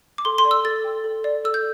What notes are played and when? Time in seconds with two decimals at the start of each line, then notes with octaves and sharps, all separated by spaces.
0.18 D6
0.25 A4 C6
0.38 C6
0.45 D5
0.51 E6
0.65 A4 A6
0.84 G5
1.04 A4
1.24 D5
1.44 A4 E6
1.54 G6